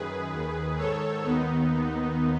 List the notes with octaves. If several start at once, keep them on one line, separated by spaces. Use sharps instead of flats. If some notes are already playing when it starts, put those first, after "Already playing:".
Already playing: F#2 D#3 G#4 B4
D#2 D#3
G#2 D#3 A4 C#5
D#2 D#3 B3 D#4
D#2 D#3